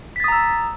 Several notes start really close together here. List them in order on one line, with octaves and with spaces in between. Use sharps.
B6 A6 D#6 A#5 E6